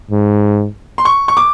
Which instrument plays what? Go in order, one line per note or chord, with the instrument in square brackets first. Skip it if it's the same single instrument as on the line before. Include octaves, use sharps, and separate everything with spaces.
[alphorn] G#2
[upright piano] C6
C#6
C#6
D6